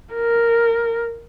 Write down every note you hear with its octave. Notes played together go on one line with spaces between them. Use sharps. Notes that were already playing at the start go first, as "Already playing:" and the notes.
A#4